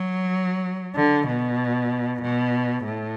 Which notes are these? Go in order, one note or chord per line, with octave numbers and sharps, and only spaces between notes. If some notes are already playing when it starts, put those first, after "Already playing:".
Already playing: F#3
D3
B2
B2
A2